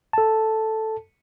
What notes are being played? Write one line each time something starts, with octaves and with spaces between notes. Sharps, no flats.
A4 A5